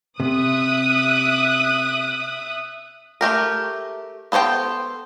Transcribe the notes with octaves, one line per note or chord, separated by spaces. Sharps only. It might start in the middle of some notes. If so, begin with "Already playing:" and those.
C3 E5 D#6 F#6
A3 G4 A#4
B3 A4 C5 C#5 G5